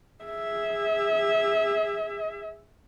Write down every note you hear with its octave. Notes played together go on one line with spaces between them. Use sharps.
G#4 E5